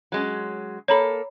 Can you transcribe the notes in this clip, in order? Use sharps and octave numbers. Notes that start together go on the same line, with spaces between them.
F#3 G#3 C#4
A#3 A4 C#5 A#5 B5